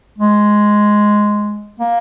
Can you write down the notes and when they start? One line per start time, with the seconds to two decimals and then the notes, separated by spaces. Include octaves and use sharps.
0.18 G#3
1.80 A#3